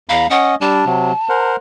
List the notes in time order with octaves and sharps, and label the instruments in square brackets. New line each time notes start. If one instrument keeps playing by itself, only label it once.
[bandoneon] E2 A#5 B5 [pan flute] F5
[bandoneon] C#4 D#5 [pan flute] F#5
[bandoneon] G3 D4 [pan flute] A5
[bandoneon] C3 F#3
A#4 C5 F#5